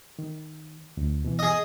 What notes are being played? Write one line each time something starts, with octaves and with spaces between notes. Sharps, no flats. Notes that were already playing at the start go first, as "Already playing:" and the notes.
D#3
D2
B2 E3
G#4 D#5